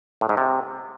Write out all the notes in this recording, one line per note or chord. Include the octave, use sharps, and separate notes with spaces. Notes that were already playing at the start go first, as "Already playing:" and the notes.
A2
G#2
C3